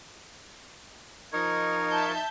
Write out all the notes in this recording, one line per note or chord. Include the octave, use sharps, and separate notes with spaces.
F3 D#4 A#4 C#6 G#6
E5 A5 G6